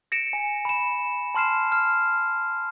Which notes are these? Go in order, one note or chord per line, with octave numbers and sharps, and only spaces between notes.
A#6 C#7 D7 E7
G#5
B5 E7
A5 C6 F6 C7 E7
F6